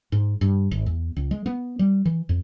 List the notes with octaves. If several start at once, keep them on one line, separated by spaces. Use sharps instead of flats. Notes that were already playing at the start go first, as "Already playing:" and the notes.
G#2
G2
G#1
E2
C#2
G#3
B3
G3
E3
F2